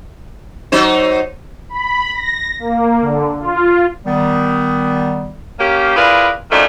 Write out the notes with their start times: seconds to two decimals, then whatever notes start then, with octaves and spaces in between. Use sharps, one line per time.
0.72 F#3 D#4 C5
1.69 B5
2.13 A#6
2.59 A#3
3.01 D3
3.40 F4
4.06 D#3 G3 B3
5.60 A#3 C#4 G4
5.96 E4 F4 G#4 A#4 B4 D5
6.51 F#2 D#3 F3 A3 D4